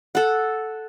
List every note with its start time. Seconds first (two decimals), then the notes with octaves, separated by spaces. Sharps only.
0.15 A4 F#5